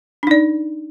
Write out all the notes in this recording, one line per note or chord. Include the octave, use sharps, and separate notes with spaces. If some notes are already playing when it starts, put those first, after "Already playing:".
D4 D#4 D5